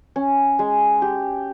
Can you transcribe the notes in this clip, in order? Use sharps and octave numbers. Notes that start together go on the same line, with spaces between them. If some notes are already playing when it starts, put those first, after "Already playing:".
C#4
G#3
G4